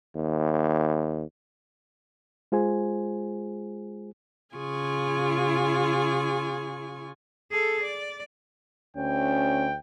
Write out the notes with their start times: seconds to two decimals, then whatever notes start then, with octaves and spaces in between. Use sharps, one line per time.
0.16 D#2
2.52 G#3 F4 G#4 C5 G#5
4.56 C#3 F4 G#4 G#5 C#6
7.51 G#4 A4
7.83 D5
8.97 D2 C#4 G5